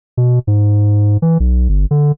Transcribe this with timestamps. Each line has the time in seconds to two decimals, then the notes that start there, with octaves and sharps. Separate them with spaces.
0.17 B2
0.47 G#2
1.22 E3
1.40 B1
1.69 G1
1.91 D3